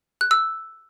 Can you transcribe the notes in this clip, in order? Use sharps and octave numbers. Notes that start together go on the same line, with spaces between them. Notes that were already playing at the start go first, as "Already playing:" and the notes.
F#6
E6